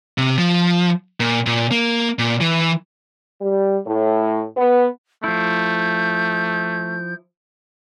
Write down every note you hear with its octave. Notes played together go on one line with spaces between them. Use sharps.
C3
F3
A#2
A#2
A#3
A#2
E3
G3
A2
B3
F3 A3 E4 G6